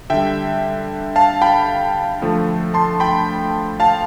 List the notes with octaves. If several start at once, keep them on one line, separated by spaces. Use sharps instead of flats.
D3 G3 E5 G5
F5 A5
G5 B5
D3 F3 A3
A5 C6
G5 B5
F5 A5